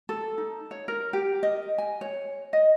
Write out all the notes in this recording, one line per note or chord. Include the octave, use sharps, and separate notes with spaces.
A4
D#4
C#5
A#4
G4
D#5
G#5
C#5
D#5